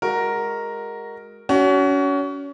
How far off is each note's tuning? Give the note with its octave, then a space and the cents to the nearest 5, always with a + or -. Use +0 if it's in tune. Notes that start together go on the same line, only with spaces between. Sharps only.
G#3 +0 F#4 +5 A#4 +0
C#4 +30 F#4 +25